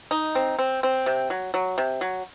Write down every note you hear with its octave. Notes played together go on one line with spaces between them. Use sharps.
D#4
C4
C4
C4
C3
F#3
F#3
C3
F#3